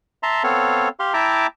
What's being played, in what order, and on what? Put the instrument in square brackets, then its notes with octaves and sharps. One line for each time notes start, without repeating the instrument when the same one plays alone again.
[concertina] E5 A5 A#5 C6
B3 C4 A4 C#5 F5
G4 F5 C6
E4 E5 G5 A5 A#5 D6